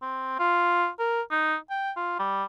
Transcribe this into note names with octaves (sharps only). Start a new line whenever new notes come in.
C4
F4
A#4
D#4
G5
F4
G3